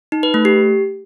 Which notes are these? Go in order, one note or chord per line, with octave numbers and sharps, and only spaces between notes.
D#4
B4
A3
G4